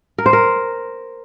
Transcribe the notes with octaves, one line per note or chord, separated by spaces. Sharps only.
A#4
C5
A#4